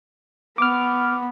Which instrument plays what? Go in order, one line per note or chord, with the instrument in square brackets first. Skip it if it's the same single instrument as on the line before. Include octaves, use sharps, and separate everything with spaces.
[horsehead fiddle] B3 [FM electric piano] D6 F6